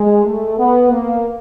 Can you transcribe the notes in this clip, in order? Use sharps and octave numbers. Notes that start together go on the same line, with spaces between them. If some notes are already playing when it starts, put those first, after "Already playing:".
Already playing: G#3
A3
B3
A#3